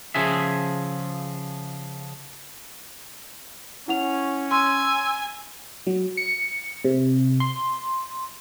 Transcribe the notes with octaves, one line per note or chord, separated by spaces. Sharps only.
C#3 F3 G#4 E5
C#4 E4 F#5 F7
G#5 C6 E6
F#3
C#7
C3
C6